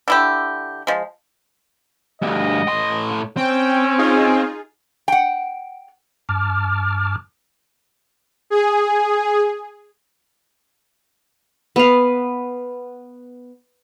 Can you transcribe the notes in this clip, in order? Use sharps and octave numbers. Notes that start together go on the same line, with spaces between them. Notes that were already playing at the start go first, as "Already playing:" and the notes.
D3 E4 G4
F3 G#3
D2 G2 D#5
A2 C6
C4 C#4 G5
D#4 F4 G#4
F#5 G5
G2 A5 D6 F6
G#4
B3 F5